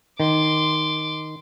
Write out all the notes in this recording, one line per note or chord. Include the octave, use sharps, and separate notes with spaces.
D#3 C6 D6